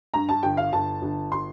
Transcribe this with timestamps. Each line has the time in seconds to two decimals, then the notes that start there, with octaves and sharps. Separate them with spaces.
0.14 G2 A#5
0.29 A5
0.43 G1 G5
0.57 F5
0.73 G1 A5
1.02 G1
1.32 C6